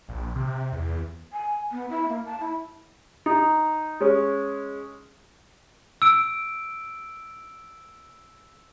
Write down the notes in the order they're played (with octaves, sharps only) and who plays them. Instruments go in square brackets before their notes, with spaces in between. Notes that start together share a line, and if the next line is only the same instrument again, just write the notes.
[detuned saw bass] A#1
C3
E2
[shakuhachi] G#5
B3
E4
A#3
A5
E4
[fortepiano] D#4
G#3 C#4
[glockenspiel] E6 D7